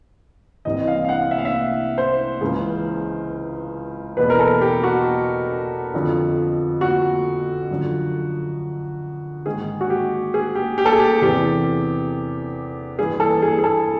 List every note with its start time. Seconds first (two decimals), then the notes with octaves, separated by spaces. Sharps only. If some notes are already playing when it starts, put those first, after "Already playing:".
0.65 C2 C3 E3 D#5
0.87 F5
1.05 F5
1.09 F#5
1.31 E5
1.38 F5
1.45 E5
1.98 C5
2.41 C#2 C#3 E3
4.17 E2 B2 B4
4.30 A#4
4.40 A4
4.61 G4
4.83 F#4
5.94 F2 D3 F3
6.81 F#4
7.70 F#2 D3 F3
9.46 G#2 D#3 G#4
9.81 F#4
9.90 G4
10.34 G#4
10.55 G4
10.78 G4
10.86 A4
10.93 G#4
11.00 G4
11.22 E2 C3 E3 G4
12.99 G2 E3 G#4
13.20 A4
13.42 G#4
13.59 G#4
13.64 A4